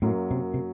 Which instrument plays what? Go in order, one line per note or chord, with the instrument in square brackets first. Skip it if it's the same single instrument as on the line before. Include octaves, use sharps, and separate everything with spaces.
[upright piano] F#2 F#3 A#3 [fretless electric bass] A2
[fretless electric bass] C3
C3